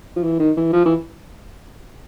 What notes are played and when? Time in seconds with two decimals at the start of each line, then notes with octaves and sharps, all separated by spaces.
0.16 F3
0.23 E3
0.40 D#3
0.57 E3
0.73 F3
0.85 E3